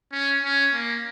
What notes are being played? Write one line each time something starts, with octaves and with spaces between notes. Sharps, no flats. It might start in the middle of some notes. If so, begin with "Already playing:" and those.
C#4
C#4
A#3